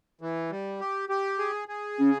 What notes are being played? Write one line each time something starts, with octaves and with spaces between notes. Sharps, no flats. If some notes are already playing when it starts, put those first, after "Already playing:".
E3
G3
G4
G4
G#4
G#4
C#3 C#4